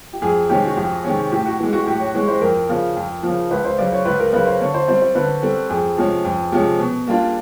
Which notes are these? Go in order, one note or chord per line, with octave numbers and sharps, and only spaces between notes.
G4
F2 G#4
C3 D#3 G#3 C#4 G4
F#4
F2 G4
C3 D#3 G#3 C#4
A2 G4
F#4
E3 G#3
F#4
A2 G4
C#5
E3 G#3 C#5
C5
F2 A#4
C#3 F3
F2
C#3 F3
C#2 B4
C5
C#3 F#3 D5
C#5
C#2 B4
A#4
C#3 F#3 B4
C5
D3 C#5
C5
G3 C4 C5
C5
D3 B4
G3 C4 A4
F2 G#4
C3 F3 G#3 C#4
F2
C3 F3 G#3 C#4
B2
G3 A#3 D4 F4